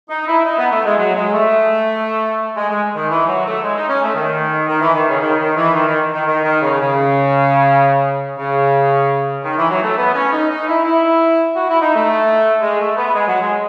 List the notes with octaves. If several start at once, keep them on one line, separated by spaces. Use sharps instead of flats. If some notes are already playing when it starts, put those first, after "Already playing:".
D#4
E4
D#4
B3
A3
G#3
F#3
G#3
A3
G#3
G#3
D#3
E3
F#3
A3
G#3
D#4
C#4
A3
D#3
D#3
E3
D#3
C#3
D#3
D#3
E3
D#3
D#3
D#3
D#3
D#3
C#3
C#3
C#3
D#3
E3
F#3
A3
B3
C#4
D#4
D#4
E4
E4
F#4
E4
D#4
A3
G#3
A3
B3
G#3
F#3
G#3